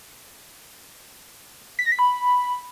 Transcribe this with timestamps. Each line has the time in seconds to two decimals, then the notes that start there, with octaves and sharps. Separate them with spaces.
1.79 B6
1.85 A#6
1.92 B6
1.99 B5